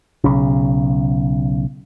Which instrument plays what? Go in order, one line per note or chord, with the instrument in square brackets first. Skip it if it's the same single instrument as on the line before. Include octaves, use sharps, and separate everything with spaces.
[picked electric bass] B1 C#3